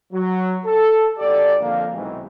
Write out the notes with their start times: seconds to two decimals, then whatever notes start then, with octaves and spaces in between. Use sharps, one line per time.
0.12 F#3
0.65 A4
1.18 G#1 G4 A4 D5
1.60 F2 D3 F3 A#3
1.92 B1 G#2 C3 D#3 E3 G#3